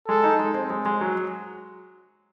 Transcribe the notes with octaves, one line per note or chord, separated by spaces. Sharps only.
G#3 A4
D#4
G#3
C4
G#3
G#3
F#3